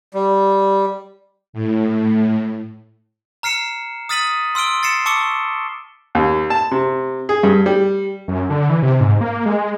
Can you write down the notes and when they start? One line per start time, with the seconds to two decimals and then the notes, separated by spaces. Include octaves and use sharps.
0.14 G3
1.53 A2
3.43 A#5 F6 C7 C#7 E7
4.09 D#6 F6 A6 B6 D#7 F#7
4.55 C6 E6 F6 D7 G7
4.83 A6 C7 C#7 E7
5.06 A5 C#6 D6 E6 C#7 G7
6.15 D#2
6.50 A5
6.71 C3
7.29 G#4
7.43 G2
7.66 G3
8.28 F#2
8.50 D3
8.70 E3
8.82 C3
9.00 G#2
9.21 A#3
9.46 G#3